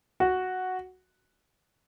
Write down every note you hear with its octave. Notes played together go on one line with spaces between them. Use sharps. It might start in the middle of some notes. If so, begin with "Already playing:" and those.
F#4